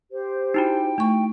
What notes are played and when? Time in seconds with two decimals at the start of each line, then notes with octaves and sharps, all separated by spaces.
0.12 G4 C5
0.54 D#4 E4 F#4 G5
0.98 A3 C#6